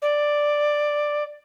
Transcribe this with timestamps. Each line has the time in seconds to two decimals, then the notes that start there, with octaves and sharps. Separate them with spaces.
0.02 D5